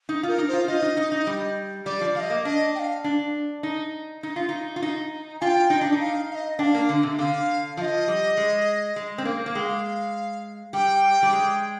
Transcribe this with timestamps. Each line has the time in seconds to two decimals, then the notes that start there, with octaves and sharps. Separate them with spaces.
0.09 D#4
0.23 F4 A#4
0.38 D#4
0.48 C5
0.53 F4
0.67 F4 D#5
0.82 D#4
0.97 D#4
1.12 D#4
1.27 G3
1.86 G3 D5
2.01 F3
2.15 G3 F5
2.20 D#5
2.30 A#3
2.45 D4 D#5
2.75 G5
2.79 F5
3.04 D4
3.63 D#4
4.23 D#4
4.36 F4
4.49 D#4
4.76 F4
4.82 D#4
5.41 F4 G5 G#5
5.70 D#4
5.81 D4
5.92 D#4
6.00 F5
6.30 F5
6.35 D#5
6.59 D4 G5
6.63 F5
6.74 A#3
6.89 D3
7.03 C3
7.19 D3 F5
7.77 F3 F5
7.81 D#5
8.08 G3
8.37 G#3
8.96 G#3
9.18 C4
9.25 A#3
9.46 A#3
9.55 G#3 G5
9.59 F5
10.73 G3 G5
11.23 G3
11.33 G#3